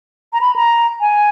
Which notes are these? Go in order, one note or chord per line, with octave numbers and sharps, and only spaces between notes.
A#5
B5
A#5
G#5